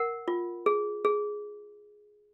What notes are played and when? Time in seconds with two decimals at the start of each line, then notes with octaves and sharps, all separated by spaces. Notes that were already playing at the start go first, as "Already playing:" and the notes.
Already playing: A#4 F#5
0.28 F4
0.66 G#4
1.05 G#4